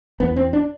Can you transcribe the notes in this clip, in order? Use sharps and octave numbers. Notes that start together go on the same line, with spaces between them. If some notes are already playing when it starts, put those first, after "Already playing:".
E2 B3
C4
D4